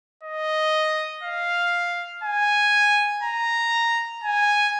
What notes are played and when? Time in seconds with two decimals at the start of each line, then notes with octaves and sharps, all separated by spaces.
0.23 D#5
1.23 F5
2.23 G#5
3.23 A#5
4.24 G#5